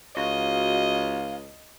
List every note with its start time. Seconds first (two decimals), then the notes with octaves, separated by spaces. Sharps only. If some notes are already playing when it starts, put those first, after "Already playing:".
0.17 C#2 F#4 D#5 F5